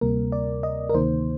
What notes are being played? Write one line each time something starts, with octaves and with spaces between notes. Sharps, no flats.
D2 C3 G3 A#3 A#4
D5
D#5
A#4
D2 C3 D#3 A#3 D#4 C5